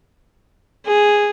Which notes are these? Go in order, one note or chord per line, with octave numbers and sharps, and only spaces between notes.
G#4